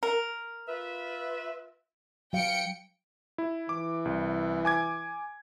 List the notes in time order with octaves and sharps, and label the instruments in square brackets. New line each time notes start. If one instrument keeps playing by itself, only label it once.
[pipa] A#4
[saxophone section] F4 E5 [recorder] B4
[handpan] F#3 F5 [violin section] G5 C#7 D7
[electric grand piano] E4
[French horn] E3 [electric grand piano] D6
[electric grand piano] C2
G#5 D6 G#6